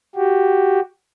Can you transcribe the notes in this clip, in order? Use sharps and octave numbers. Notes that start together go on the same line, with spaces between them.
F#4 G4